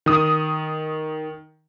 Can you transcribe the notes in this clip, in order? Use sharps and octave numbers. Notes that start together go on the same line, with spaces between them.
D#3 D#6